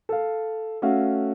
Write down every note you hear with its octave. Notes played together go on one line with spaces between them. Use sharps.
A4 F5
A3 C#4 F#4 E5 F5